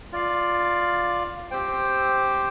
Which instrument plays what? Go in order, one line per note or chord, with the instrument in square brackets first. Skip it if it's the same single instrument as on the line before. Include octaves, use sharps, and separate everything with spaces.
[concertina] F4 D5 F5
C4 G4 C5 G5